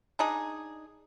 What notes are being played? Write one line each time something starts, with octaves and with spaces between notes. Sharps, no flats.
D4 D#4 G#4